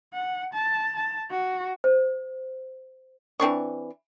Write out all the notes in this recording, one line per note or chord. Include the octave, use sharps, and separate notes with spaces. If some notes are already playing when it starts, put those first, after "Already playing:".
F#5
A5
A5
F#4
C5
E3 C4 D4 C#6